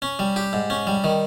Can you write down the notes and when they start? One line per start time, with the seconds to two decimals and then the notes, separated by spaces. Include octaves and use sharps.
0.02 C#4
0.19 G3
0.36 G4
0.53 G#2
0.70 C#4
0.87 G3
1.04 D#3